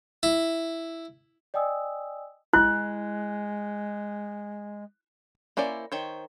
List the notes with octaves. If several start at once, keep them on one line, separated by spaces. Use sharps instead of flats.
E4
D5 D#5 G5 G#5 D#6 E6
G#3 E4 F#6
A#3 C#4 E4 C5 D5
D#3 C5 C#5